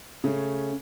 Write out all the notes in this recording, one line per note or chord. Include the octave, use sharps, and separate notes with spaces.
C#3 A3 C#4